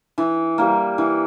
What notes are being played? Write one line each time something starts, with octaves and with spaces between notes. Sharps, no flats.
E3
G3 A#3
E3